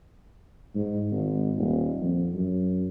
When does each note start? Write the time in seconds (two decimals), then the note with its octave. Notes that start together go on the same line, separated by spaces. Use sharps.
0.75 G#2
1.11 G#1
1.56 D#1
2.00 F2
2.34 F#2